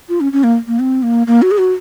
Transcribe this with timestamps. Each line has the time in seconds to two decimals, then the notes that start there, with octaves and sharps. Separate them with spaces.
0.09 F4
0.21 C#4
0.33 C#4
0.44 A#3
0.67 A#3
0.79 C4
1.03 A#3
1.27 A#3
1.42 F#4
1.51 G#4
1.58 F#4